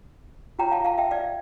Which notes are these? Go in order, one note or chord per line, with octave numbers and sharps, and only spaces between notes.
F4 C#5 G5 A#5
F5 A5
F5 A5
E5 G5
D5 F5